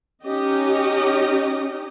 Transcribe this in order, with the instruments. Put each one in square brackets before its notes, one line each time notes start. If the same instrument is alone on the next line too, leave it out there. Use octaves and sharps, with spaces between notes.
[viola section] C#4 D#4 G4 D#5